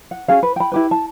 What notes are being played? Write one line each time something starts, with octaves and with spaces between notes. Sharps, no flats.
F#5
C#4 F#4 G#4 F5
B4
G5 B5
E4 G4 B4
A5